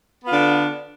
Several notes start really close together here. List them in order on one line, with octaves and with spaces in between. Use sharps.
B3 F4 D3 D4